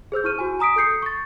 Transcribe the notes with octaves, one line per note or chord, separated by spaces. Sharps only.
G#4 C5 E6 G6
E4 C#6 F6 D#7
F#4 G#5
G#5 A#5 D#6 B6 D7
A4 D#6 G6 C7 C#7
C#6 A6